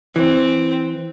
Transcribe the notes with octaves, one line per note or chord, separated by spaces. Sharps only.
E3 C4